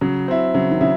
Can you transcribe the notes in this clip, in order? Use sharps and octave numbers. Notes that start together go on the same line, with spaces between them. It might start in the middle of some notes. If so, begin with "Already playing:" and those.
C#3 F#3
C4 E4
C#3 F#3
D#3
C#3 E4